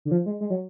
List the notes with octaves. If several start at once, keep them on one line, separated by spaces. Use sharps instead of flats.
D3
F3
G#3
G#3
F#3